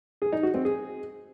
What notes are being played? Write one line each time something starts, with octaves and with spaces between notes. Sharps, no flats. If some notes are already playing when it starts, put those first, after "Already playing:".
G#4
D#4
F#4
C4
G#4